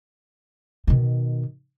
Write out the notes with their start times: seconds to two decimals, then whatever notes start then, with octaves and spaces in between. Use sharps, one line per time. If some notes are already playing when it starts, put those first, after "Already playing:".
0.87 B2 D#3